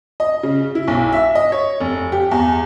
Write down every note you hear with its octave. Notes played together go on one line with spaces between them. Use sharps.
D#5
C#3
E4
B1
E5
D#5
C#5
F1
G4
E2